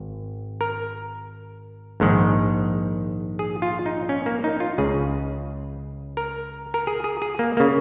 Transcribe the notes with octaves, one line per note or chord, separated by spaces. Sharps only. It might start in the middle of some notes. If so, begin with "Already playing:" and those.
Already playing: G#1
A#4
A#1 G#2 D#3
G#4
F4
D#4
C#4
A#3
D#4
F4
C#2 C#3 G#4
A#4
A#4
G#4
G#4
G#4
A#3
C#3 A#3